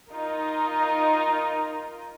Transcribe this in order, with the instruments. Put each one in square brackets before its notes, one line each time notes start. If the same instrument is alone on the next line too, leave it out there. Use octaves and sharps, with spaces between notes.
[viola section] D#4 F4 A#4 D#5